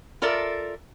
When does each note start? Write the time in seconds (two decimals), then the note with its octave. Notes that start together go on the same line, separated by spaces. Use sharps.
0.22 F4 A4 A#4 D5 E5